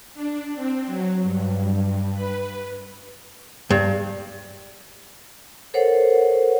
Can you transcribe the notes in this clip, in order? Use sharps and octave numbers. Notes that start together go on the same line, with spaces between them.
D4
C4
F#3
G2
B4
G2
A4 A#4 C5 C#5 F#5